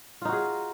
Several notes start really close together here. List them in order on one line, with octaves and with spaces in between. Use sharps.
F4 D#4 F#4 G#4